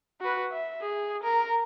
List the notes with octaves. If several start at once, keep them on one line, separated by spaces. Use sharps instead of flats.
F#4 B4
E5
G#4
A#4